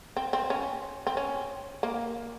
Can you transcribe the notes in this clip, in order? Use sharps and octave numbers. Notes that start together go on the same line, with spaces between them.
C4
C4
C#4
C4
C#4
A#3